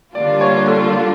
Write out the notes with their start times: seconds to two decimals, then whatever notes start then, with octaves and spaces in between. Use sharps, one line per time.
0.15 D3 G3 A#3 D4 F4 D5
0.41 C#5
0.67 A4